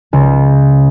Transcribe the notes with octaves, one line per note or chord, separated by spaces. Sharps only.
C#2